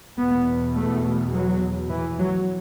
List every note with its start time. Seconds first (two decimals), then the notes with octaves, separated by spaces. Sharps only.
0.18 E2 B2 B3
0.75 A3
1.33 F#3
1.89 E3
2.18 F#3